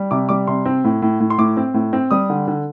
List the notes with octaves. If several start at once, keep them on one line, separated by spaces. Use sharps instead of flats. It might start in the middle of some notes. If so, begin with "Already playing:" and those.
Already playing: G3
C3 D6
G3 D6
C3 C6
C4
A2
A2
A2
C6
A2 D6
C4
A2
C4
G3 D#6
D3
D3